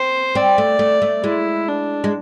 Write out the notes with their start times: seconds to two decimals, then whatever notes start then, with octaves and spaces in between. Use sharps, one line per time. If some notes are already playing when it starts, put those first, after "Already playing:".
Already playing: C4 C5
0.35 C4 D5
0.58 A3
0.79 A3
1.02 A3
1.24 G#3 E4
1.68 D4
2.04 G#3